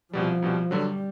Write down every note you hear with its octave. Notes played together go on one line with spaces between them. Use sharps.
C2 B2 F3 G3
C2 B2 G3
G2 D3 F#3 G3